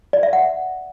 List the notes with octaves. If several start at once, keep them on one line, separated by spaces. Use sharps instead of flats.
D5
E5
F#5